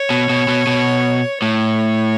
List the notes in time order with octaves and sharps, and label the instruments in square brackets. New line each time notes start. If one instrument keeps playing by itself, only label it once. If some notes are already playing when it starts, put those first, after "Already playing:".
Already playing: [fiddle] C#5
[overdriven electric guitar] B2
B2
B2
B2
[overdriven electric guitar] A2 [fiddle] C#5